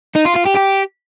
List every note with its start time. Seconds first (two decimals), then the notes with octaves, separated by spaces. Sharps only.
0.15 D#4
0.25 F4
0.35 F4
0.45 G4
0.56 G4